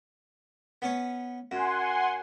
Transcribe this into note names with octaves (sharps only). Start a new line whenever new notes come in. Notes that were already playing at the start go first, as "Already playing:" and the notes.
B3 C#4 C#5
F#2 F#5 G#5 C6